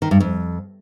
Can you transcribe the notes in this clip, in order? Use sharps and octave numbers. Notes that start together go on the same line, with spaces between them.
D#3
G2
F2